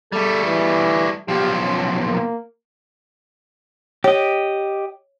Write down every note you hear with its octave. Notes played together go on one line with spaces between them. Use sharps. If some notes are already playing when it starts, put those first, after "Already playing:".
G3 A3 A4
E3
B1 F3 G4
C#4
A#3
G4 C#5 D#5